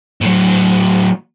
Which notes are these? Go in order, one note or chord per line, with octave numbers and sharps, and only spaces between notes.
A2 F#3